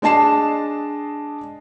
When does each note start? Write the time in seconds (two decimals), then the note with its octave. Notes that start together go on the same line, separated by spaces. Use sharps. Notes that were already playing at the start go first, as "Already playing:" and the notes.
0.02 G#3 D4 D#5 A5 C7 E7